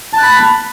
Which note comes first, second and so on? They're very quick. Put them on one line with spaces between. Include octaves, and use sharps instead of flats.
A5 F#6 B5